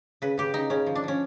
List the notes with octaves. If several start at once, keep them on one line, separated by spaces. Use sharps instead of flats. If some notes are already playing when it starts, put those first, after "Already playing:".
C#3 B4
C#3 G4
C#3 D#4
C#3 C#4
F3
D4
F3 C#4